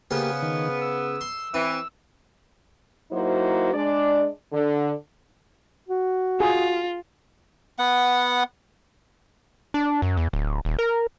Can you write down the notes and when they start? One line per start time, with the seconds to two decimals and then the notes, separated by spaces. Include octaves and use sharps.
0.11 C#3 A#3 B3 C#4 G4 C5
0.42 D#3
0.82 E6
1.21 C6
1.54 E3 C4
3.11 F#3 A#3 D#4 E4 F#4 C5
3.73 G#3 D4 D5
4.52 D3
5.88 F#4
6.40 F4 G#4
7.79 B3 F#5
9.74 D4
10.02 F#2
10.17 E2
10.33 D1
10.65 D#1
10.79 A#4